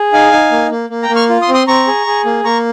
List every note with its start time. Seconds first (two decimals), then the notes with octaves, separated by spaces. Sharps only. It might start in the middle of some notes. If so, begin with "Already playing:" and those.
Already playing: G#4
0.13 D#4 F5 G#5
0.33 D#4
0.51 A#3
0.71 A#3
0.90 A#3
1.02 G5 A#5
1.09 A#3
1.15 C#6 F6
1.29 F4
1.42 C6 D#6
1.49 C4
1.54 C6 D#6
1.67 C4 A#5 C#6
1.87 G#4
2.07 G#4
2.25 A#3
2.44 A#3 A#5 C#6